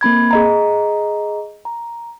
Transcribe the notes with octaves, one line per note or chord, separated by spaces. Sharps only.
A#3 C4 B5 G#6
G#4 D#5 A#5
A#5